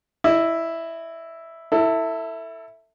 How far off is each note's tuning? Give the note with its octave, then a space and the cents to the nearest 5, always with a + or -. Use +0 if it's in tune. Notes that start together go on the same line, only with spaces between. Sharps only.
E4 +0 D#5 -30
E4 -5 A4 +25